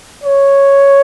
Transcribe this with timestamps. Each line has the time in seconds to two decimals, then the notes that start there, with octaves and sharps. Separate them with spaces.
0.24 C#5